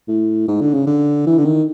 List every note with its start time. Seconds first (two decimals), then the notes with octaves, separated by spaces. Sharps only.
0.08 A2
0.48 G#2
0.61 D3
0.74 C#3
0.87 D3
1.27 E3
1.38 D3
1.45 D#3